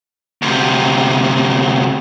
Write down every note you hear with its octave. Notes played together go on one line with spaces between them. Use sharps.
D2 C3